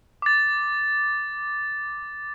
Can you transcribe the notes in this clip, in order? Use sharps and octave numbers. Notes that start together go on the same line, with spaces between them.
D6 A6